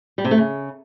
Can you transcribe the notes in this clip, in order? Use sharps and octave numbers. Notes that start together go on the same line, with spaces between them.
G3
C3
A3
C#3